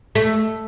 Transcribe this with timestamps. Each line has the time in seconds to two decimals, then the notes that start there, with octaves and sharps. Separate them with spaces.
0.15 A3